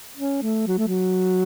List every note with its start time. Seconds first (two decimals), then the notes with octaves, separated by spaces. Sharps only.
0.17 C#4
0.42 A3
0.68 F#3
0.78 A3
0.88 F#3